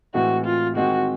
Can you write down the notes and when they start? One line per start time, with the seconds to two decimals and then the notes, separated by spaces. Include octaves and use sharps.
0.14 A2 E3 G#3 C4 E4 F#4
0.45 F4
0.76 D#3 G#3 C4 F#4